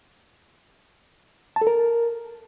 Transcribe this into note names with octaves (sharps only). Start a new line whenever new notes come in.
A5
A4
A#4